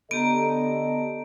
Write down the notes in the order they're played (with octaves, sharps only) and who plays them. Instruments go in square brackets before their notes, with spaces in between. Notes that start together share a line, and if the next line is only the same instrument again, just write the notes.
[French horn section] D3 A4 D#5 [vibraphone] B3 G4 A#5 [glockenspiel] D7